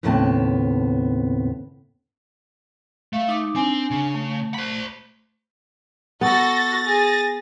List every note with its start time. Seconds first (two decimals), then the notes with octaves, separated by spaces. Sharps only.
0.03 D#2 A2 C#3 B3 C4 A5
3.13 A3 F5
3.28 D#4 D6
3.56 C4 D4 G#5
3.91 C#3
4.14 A3
4.54 C5 B5
6.21 B3 F#4 A4 A6 A#6
6.85 G#4